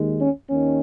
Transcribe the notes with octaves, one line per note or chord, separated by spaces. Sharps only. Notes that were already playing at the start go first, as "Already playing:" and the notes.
Already playing: D#2 D#3 G#3
C#4
D#2 D#3 C#4